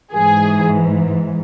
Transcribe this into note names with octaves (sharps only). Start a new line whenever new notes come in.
G#2 E3 G#4